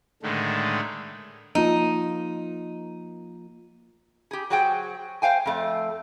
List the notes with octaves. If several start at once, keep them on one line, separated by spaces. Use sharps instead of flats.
A2 D3 D#3 G#3 A3
F3 A#3 D#4 F4
G4 G#4
F#3 F#4 G#4 C5 F#5 G5
C5 F5 G5 G#5
F2 A3